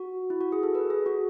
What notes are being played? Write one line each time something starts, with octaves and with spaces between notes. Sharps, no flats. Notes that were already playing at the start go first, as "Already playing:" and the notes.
Already playing: F#4
E4
F#4
G#4
A4
B4
G#4
F#4